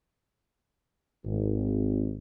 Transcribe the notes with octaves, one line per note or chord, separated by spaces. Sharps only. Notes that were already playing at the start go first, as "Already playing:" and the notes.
G#1